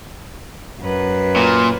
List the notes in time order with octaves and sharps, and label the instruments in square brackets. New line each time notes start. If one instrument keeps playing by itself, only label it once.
[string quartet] F#2 B4
[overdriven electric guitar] A#2